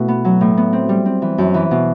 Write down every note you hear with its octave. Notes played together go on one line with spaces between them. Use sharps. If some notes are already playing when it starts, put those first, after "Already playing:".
Already playing: B2 A3 E4
B3
F#3
A2
B3
C4
G3
C4
E3
F#2
E3
B2